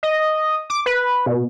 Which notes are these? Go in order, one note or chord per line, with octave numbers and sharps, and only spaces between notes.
D#5
D6
B4
B2